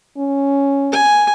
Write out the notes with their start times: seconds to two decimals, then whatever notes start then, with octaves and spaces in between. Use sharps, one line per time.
0.18 C#4
0.92 G#5